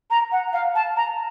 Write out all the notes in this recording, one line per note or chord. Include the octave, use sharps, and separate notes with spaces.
A#5
F#5
F5
A5
A#5